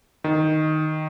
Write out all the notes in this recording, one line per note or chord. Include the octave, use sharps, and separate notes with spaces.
D#3